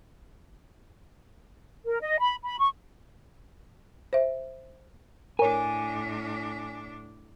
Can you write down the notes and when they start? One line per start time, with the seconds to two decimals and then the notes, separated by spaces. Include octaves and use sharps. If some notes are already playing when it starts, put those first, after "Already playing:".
1.86 A#4
2.01 D#5
2.20 B5
2.44 B5
2.59 C#6
4.13 C5 E5
5.39 A2 D4 A#4 C#5 G#5